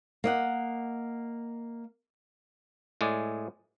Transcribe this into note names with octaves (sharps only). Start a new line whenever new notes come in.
A#3 D#5 F#5
A2 G#3 G#4 D5